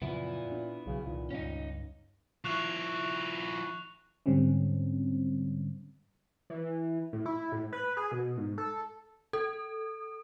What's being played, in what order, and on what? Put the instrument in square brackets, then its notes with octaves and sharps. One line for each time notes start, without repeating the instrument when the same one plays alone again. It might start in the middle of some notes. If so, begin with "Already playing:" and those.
[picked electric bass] F#2 C#3 F3 [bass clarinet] A#2 [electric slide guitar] B3 E4
[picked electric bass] D4
[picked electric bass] B1 F#3 [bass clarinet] C#3
[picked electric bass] C2 D#3 [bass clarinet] A#2
[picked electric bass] C#2 G2 [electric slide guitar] C#4 D#4
[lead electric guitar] F3 E4 [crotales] C#6 F#6 F7
[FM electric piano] G#2 D3 G3 C4 C#4
[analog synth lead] E3
A2
E4
A2
B4
G#4
B2
G#2
A4
[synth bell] A4